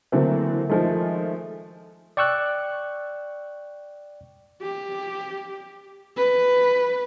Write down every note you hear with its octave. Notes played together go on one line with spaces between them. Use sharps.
D3 E3 F#3 A3 A#3 C4
D#3 F3 G#3 A3
D5 G5 C#6 E6 F#6
G4
B4